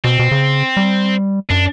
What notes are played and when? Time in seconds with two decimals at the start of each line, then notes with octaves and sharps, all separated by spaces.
0.04 B2 C4
0.19 B2
0.31 C#3
0.77 G3
1.50 F#2 D4